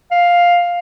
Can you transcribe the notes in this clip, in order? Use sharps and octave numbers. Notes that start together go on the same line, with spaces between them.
F5